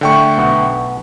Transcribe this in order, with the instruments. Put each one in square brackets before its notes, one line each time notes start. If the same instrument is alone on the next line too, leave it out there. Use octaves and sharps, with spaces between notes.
[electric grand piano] D3 G5 C#6 [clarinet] A3
[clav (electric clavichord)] B1 B3 F#4